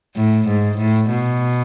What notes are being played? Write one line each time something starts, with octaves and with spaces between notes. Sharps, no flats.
A2
G#2
A2
B2